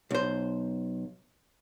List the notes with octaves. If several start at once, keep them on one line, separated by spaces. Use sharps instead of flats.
B1 C5